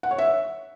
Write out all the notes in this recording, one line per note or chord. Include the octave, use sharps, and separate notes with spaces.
F#5
C#5
E5